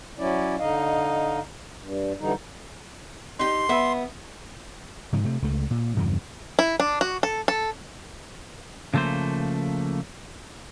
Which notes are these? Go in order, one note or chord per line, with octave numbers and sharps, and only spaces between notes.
F#3 C#4 E4 D5
D3 D#4 D#5 F5
G2
D3 E3 G3 D#4
D#4 G4 C6
B3 E5
G#2 C#3 F3
C3 A3
C#2 A3
A#2
E2 G2 C#3 F3
E4
D4
F#4
A4
A4
C#3 F3 A3 A#3 C5